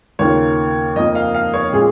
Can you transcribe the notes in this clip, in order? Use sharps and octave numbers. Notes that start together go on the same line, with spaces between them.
D#2 C#3 A#3 F4 C#5
F2 F3 A#3 D#5
F5
F5
C#5
A#2 G#3 C#4 F4 G#4